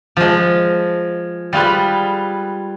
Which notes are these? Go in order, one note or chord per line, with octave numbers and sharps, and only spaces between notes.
F3 G#3
G3 F4 G#4 B4